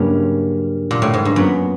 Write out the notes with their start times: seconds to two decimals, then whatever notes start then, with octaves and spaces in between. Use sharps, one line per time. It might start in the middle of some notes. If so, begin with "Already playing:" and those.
Already playing: G2 C#3 F#3 A#3 C#4
0.91 A#2
1.02 A2
1.14 G#2
1.25 G2
1.36 F#2 A#2 F#3 B3